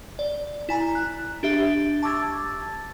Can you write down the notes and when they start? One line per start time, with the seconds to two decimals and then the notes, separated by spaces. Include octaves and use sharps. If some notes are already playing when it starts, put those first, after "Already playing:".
0.19 D5
0.69 E4 G#5 A#5
0.95 F#6
1.43 D4 G4 E5
2.03 A5 C#6 D6 E6 G#6 A6